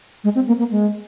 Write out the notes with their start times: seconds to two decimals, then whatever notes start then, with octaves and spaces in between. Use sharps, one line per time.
0.24 G#3
0.35 C4
0.47 A#3
0.59 A#3
0.71 G#3